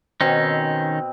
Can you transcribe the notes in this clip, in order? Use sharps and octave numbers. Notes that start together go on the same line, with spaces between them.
B2 D#3 C4 C#4 D#4